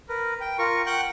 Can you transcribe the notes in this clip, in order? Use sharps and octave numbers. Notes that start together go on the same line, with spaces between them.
A#4 B4
G5
F4 A#4 C#6
F#5 G5 C#6 F#6 G6